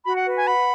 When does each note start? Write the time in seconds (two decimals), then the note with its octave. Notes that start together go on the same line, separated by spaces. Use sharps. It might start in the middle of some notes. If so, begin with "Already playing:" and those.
0.05 F#4 B5
0.16 F#5
0.26 B4
0.37 G#5
0.46 F#5 B5